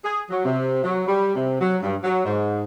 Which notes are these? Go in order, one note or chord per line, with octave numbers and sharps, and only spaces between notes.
G#4
F#3
C3
F#3
G3
C3
F#3
G2
F#3
G#2